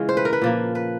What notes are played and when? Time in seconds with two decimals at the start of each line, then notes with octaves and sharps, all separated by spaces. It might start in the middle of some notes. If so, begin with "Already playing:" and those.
Already playing: C#3 E3 G#3 F4
0.09 C5
0.17 B4
0.25 A#4
0.33 B4
0.42 A#2 F3 A#3
0.75 B4